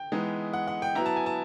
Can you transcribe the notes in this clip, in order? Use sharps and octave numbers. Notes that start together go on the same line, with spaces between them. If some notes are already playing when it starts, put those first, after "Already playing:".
Already playing: G5
E3 G#3 B3 D#4
F#5
F#5
G5
F#3 B3 E4 A#5
A5
G#5
A5